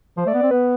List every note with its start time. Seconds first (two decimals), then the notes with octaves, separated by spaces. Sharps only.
0.17 F3 C5
0.26 A3 D5
0.34 B3
0.39 C4 D5
0.51 B3 B4